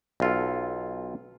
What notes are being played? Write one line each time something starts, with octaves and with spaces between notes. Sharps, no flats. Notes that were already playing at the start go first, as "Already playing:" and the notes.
B1 F4 A4